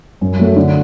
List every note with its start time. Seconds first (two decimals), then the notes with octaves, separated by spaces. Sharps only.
0.21 F#2
0.39 F#3 A3
0.56 D3